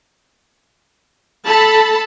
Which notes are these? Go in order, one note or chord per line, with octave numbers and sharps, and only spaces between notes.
A4 A5 B5